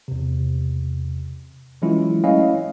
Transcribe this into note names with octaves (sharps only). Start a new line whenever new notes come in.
E2 C3
E3 F#3 G#3 C#4 E4 F4
A3 C#4 E4 D#5 F5